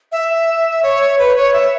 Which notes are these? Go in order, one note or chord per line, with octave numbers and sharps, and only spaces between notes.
E5
C#5
B4
C#5
E5